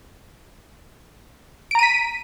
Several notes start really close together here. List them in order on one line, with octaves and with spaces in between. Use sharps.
D7 A#5 D#7 B6